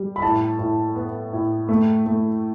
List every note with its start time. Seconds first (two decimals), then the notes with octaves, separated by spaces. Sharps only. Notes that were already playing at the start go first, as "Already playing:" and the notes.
Already playing: G3
0.16 B5
0.22 A2 A5
0.59 A2
0.96 B3
1.33 A2
1.69 A3
2.06 A3